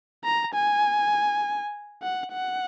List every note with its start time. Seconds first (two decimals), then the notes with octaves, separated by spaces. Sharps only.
0.24 A#5
0.54 G#5
2.03 F#5
2.33 F#5